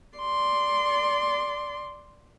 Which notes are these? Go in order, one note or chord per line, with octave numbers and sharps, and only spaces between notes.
D5 C6